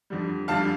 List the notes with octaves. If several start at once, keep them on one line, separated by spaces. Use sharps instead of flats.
F2 D3 G3
F2 D3 G3 F5 A5